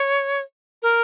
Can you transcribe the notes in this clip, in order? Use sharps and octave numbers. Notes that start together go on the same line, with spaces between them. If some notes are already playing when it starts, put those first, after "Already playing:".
Already playing: C#5
A#4